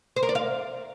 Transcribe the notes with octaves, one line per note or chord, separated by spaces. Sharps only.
C5
A#4
D5
F5